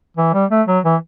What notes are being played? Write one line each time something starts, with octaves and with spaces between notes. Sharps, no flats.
E3
G3
A3
F#3
E3